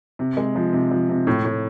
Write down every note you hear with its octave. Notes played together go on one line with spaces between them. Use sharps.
C3
G#3
F3
C3
F3
C3
A2
A2